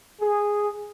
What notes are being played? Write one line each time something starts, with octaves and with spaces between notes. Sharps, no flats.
G#4